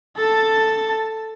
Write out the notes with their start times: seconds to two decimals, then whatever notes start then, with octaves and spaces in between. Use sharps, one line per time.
0.16 A4 A5